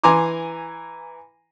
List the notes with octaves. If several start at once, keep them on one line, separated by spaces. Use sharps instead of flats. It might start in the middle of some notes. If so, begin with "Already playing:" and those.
E3 G#5 A#5 C6 D6